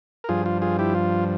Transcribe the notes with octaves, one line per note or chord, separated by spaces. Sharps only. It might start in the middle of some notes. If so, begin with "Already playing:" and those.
A#4
G2 F3 F4 G#4
F4
F4 G#4
E4 G4
F4